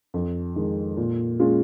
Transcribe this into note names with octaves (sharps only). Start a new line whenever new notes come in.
F2
D#3 G#3
A#2
G#3 C#4 F4